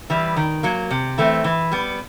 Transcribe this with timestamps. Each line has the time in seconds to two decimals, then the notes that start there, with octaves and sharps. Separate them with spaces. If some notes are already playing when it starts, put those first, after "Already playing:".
0.10 E3 G3
0.36 D#3
0.63 F#3 A#3
0.91 C3
1.18 E3 A3 C4
1.44 E3
1.71 G3 B3